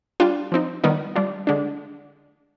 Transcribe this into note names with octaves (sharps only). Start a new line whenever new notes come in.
G3 D4 F4
F3 C4 D#4
D#3 G3 B3 D#4
G3 D4 F4
D3 G#3 D4